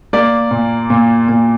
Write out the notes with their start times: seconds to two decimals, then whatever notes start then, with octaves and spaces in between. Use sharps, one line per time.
0.13 A#3 D5
0.51 A#2
0.90 A#2
1.29 A#2